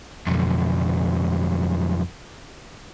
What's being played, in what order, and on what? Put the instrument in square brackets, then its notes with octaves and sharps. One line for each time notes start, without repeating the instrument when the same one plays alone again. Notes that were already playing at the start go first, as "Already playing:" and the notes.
[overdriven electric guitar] B1 F2